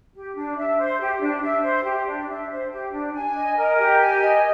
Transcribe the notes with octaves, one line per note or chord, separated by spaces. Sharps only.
G4
D4
E5
C5
G4
D4
E5
C5
G4
D4
E5
C5
G4
D4
G#5
D#5
A#4
G4
G#5
D#5